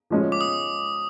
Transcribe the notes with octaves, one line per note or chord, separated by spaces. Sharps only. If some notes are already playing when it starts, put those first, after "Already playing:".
F3 G#3 C#4
D6
D#6